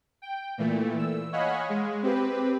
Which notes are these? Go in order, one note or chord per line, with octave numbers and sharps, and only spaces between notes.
G5
A#2 E3 A3
E6
C#5 D#5 F5 F#5 G#5 B5
G#3
C4 G4 B4